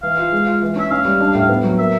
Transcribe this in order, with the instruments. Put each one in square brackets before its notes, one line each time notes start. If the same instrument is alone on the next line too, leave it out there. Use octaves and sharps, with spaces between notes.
[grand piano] E3 [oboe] F5
[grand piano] F4
G#3
F4
E3
[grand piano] C#4 [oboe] E5
[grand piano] C#4 [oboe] F5
[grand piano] G3
D4
A2
B3
F#3
[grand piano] A#3 [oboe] E5